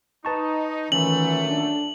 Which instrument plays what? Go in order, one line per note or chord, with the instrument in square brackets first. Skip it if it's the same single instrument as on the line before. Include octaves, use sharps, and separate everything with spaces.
[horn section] D#4 [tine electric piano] B4 A5 C#6
[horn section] A#2 F#3 A3 [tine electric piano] D#3 C#4 [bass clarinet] E3 [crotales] F#7
[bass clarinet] D4